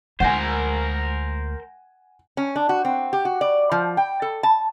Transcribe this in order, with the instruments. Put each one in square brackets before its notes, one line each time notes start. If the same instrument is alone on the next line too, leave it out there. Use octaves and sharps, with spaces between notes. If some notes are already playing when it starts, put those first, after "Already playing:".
[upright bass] D2 G#3 [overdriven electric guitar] A#4 C5 [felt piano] F#5 G#5
[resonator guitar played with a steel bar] C#4
D4
F#4
C4
G4
F#4
D5
F3
G5
A4
A5